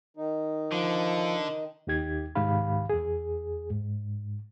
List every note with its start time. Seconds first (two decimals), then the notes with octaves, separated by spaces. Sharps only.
0.17 D#3 D#4
0.72 D3 F3
1.87 D#2 D#4 G4 G#6
2.35 C2 G#2 D#3 G4 F5 B5
2.89 E2 G#4
3.71 G#2